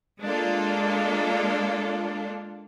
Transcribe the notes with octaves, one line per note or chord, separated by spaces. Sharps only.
G#3 A#3 D4 F4 A4